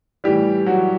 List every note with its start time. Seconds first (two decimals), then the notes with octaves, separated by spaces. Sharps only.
0.24 A2 E3 G3 G4
0.66 F#3 F#4